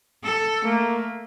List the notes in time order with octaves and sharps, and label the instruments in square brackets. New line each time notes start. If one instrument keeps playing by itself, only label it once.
[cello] A4
[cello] A3 [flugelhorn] A#3